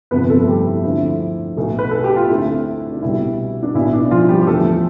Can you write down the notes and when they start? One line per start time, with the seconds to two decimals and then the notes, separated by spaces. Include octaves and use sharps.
0.11 G1 F2 C3 F3 B3 B4
0.30 A3 A4
0.42 A4
0.48 G3 G4
0.66 E4
0.84 D2 D3 F3 A3 C4 E4
1.57 B1 B2 A3
1.79 B4
1.91 A4
2.04 G4
2.16 F4
2.29 D2 D3 A3 C4 E4
2.92 D4
3.02 C2 B2 G3 E4
3.63 D4
3.75 B1 B2 B3 E4
3.93 D4
4.11 F3 F4
4.29 G3 G4
4.41 G4
4.47 E2 D3 F3 A3 A4